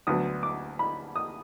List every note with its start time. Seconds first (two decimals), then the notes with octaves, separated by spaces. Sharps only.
0.07 D2 D3 F#3 B3 D#6
0.43 D6
0.79 B5
1.16 D#6